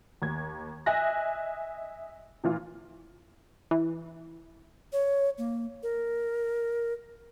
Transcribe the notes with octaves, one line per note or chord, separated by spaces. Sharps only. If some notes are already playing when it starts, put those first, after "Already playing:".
D#2 G#6
D#5 E5 G#5 F#6 A#6
A#2 E3 F4
E3
C#5
A#3
A#4